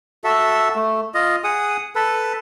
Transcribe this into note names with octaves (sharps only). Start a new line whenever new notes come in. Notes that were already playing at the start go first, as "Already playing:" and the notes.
F#4 A4 E5
A3
F4 D#5
G#4 F#5 D#6
A4 B4